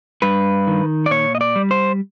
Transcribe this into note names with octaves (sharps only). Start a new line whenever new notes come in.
G2 B4
D#3
D5
A#2 C#5
D#5
D5
G3
C5